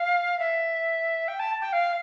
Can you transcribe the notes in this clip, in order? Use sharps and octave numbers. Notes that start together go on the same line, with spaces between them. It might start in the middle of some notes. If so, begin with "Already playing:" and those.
Already playing: F5
E5
G5
A5
G5
F5